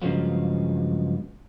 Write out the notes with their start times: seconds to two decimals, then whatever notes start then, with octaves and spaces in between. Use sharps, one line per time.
0.02 G2 C#3 F3 F#3 G#3 B3